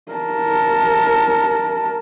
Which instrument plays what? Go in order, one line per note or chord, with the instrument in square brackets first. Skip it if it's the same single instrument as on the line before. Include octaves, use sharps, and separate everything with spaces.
[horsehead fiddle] A#4 A5